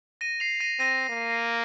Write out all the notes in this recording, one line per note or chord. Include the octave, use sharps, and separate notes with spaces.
A#6 D#7
C7 F7
A#6 D#7
C4 A#6 D#7
A#3